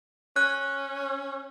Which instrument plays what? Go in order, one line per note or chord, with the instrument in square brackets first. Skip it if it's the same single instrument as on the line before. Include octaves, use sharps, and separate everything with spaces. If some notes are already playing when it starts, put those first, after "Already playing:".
[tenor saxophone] C#4 [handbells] F#6